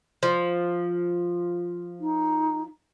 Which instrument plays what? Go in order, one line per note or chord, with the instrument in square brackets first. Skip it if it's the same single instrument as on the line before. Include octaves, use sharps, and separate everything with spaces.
[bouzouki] F3
[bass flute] D#4